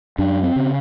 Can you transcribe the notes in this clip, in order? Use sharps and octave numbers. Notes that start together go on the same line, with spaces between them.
F#2 D4
C4
C#3